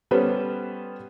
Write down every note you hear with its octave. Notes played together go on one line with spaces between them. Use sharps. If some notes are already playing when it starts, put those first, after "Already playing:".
G3 B3 C#4 A4 B4 C5